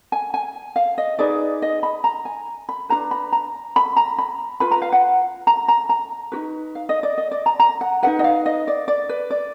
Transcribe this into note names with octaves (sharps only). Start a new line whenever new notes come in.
G#5
G#5
F5
D#5
D#4 G#4 B4 D5
D#5
B5
A#5
G#5
B5
D4 F4 B4 A#5
B5
A#5
B5
A#5
B5
F4 B4 B5
A#5
F5
F#5
A#5
A#5
A#5
D#4 F#4 B4
F5
D#5
D5
D#5
D5
A#5
A#5
F#5
D#4 G#4 B4 F#5
D#5
F5
D#5
D5
D5
B4
D5